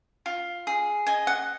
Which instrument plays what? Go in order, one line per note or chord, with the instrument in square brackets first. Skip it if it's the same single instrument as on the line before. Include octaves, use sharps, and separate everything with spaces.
[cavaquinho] F4
G#4
D#5 G#5
F#5